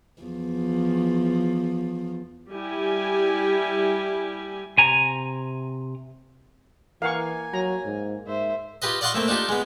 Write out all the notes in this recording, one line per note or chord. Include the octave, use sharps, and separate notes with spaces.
E2 F3
G3 E4 G4 G#5
C3 G#5 A#5
E3 A#3 F5 F#5 G#5 C#6
F#3 A#5
G#2
G#2 C5 E5
F4 G4 B4 D#5
D5 D#5 F5 F#5 C6 C#6
A3 A#3 C4
D4 D#4 F4 G4
G#3 B3